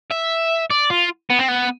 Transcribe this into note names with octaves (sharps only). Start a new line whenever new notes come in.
E5
D5
F4
B3
C4
B3